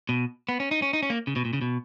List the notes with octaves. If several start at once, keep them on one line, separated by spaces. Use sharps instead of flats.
B2
B3
C#4
D#4
C#4
D#4
C#4
A#3
C#3
B2
A#2
C#3
B2